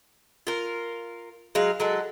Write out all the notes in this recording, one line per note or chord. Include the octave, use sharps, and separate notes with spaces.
F4 A#4
F#3 G#3 F5
F#3 G#3 A4